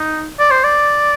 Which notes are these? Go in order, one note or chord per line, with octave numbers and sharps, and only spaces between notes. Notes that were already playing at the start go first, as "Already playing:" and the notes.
Already playing: D#4
D5
C5
D5